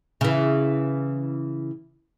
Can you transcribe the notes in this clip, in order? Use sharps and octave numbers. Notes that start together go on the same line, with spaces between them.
C#3 E3